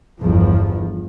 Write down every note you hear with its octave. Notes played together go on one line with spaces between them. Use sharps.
G1 E2 F3